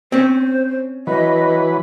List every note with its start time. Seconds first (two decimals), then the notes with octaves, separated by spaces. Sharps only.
0.12 C4 C#4 C5
1.07 E3 F#3 B4 D#5